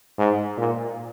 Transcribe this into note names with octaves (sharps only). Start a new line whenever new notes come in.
G#2
A#2